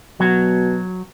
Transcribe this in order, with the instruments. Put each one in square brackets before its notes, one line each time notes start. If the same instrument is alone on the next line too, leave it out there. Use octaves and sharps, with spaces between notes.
[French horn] B2 [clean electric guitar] F#3